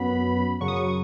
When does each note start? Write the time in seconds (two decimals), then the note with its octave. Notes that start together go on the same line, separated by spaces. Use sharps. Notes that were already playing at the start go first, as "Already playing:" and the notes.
Already playing: F#2 F#3 B3 B5
0.61 F#2 C#3 F#3 C#6
0.68 D#6
0.75 C#6